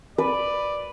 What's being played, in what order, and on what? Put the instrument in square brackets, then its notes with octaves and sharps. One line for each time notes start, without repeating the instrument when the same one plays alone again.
[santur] B4 [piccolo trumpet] D5